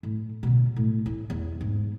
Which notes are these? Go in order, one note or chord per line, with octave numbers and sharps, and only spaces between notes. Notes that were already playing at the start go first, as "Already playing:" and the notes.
A2
B2 D3
A2
E4
E2
G#2